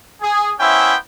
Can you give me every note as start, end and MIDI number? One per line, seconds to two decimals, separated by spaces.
0.21 0.52 68
0.60 0.95 59
0.60 0.95 61
0.60 0.95 64
0.60 0.95 72
0.60 0.95 76
0.60 0.95 79